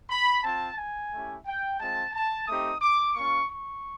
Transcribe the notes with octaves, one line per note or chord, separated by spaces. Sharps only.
B5
C4 F4 A5
G#5
A3 C#4 E4 G4
G5
G#3 C4 F4 A5
A5
A3 C4 D#4 G4 D#6
D6
A#3 C#4 F4 C#6
C#6